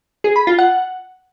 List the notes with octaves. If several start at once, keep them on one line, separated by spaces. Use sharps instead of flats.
G#4
B5
F4
F#5